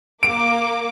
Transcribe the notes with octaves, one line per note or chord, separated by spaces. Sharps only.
A#3 D6 D7